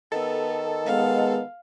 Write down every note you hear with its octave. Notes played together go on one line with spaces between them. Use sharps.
D#3 B3 A4
G#3 B3 F5